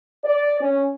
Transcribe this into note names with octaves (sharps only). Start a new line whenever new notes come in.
D5
C#4